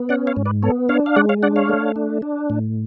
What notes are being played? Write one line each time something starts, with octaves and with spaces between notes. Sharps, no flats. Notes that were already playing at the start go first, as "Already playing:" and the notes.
Already playing: B3
C#4 D5 F#5
C#5 F5
G#2
B4 D5
B3 A4 C#5
D4 C#5 F5
F5
G#3 D5 F#5
C#5 F5
D4 D5 F#5
C#5 F5
A3
D4
D4
A2